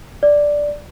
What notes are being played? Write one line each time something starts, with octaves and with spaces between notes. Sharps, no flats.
D5